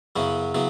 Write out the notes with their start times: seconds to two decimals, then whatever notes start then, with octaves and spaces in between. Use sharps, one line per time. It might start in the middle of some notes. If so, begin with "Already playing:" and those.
0.16 F#2 C#3 F#3 B3 E4
0.54 C#3 F#3 B3 E4